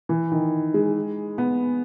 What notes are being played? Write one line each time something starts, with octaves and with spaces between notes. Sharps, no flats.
E3
D#3
G#3
B3